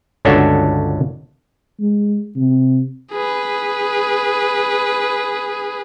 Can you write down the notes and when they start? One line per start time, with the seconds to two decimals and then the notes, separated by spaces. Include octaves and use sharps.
0.25 G1 C#2 C#4 D4 F#4 A4
1.80 G#3
2.36 C3
3.12 G#4 B4